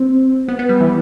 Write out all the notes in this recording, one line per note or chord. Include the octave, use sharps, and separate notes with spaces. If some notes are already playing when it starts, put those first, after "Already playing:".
Already playing: C4
B3
B3
G3
E3